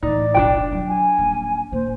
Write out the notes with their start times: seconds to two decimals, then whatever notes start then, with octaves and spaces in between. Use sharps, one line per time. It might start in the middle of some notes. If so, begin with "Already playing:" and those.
0.03 A2 E3 D#4 D5
0.34 F1 B1 D4 F#4 G5
0.72 F#3
0.88 G#5
1.18 D#1
1.72 A2 A#3 C5